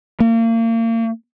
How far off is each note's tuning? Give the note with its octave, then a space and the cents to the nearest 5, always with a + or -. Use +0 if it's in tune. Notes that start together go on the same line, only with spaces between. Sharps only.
A#3 -35